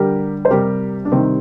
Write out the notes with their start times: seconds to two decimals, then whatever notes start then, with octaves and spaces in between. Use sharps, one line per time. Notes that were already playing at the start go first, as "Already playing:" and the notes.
Already playing: D3 G3 G4 A#4
0.45 C5
0.50 C3 G3 G4 A#4
1.05 D4
1.12 C3 D#3 G3 C4